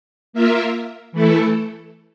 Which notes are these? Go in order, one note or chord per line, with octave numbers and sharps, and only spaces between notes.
A#3 F4 A#4 E5
E3 A3 E4 A4